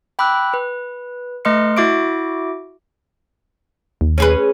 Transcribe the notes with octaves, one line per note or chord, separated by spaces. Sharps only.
G5 B5 D6 E6 F#6
B4
A3 B4 D#5 C6 F6 C#7
E4 F#4 E5 D6 A#6 D7
D#2
C#4 G#4 B4